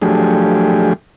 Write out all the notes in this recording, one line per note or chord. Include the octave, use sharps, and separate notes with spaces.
F3 F#3 A3 D4 G4 G#4